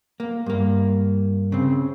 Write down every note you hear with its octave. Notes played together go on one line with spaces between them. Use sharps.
A#3
G2 A#3
C#3 C4